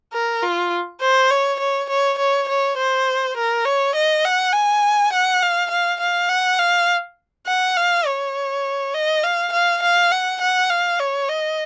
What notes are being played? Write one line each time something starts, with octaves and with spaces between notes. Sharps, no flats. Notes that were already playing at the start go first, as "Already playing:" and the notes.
A#4
F4
C5
C#5
C#5
C#5
C#5
C#5
C5
A#4
C#5
D#5
F#5
G#5
F#5
F5
F5
F5
F#5
F5
F#5
F5
C#5
D#5
F5
F5
F5
F#5
F#5
F5
C#5
D#5